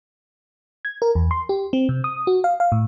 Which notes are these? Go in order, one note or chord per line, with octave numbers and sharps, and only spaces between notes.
G#6
A#4
E2
C6
G4
C4
C3
D#6
F#4
F5
F5
A2